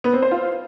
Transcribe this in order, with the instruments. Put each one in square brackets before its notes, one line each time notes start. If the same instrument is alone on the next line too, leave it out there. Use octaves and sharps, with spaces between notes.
[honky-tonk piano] B3
C4
C5
F4